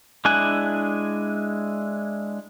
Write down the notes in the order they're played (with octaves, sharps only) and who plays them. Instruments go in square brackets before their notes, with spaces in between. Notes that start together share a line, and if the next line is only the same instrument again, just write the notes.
[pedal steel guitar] G#3 D4 E4 G#5 F#6